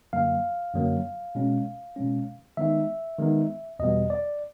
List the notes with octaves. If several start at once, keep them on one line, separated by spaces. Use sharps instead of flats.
F#2 D3 F#3 A#3 F5
F#2 D3 F#3 A#3
B2 G#3 C#4
B2 G#3 C#4
D#3 G#3 B3 D#4 E5
D#3 G#3 B3 D#4
E2 B2 G3 B3 D#5
D5